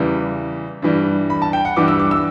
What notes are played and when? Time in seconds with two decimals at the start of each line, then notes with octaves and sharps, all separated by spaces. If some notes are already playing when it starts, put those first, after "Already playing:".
Already playing: E2 C#3 E3 G3
0.82 G2 E3 G3
1.30 B5
1.42 A5
1.53 G5
1.65 F#5
1.76 G2 E3 G3 D6
1.88 E6
1.99 D6
2.11 E6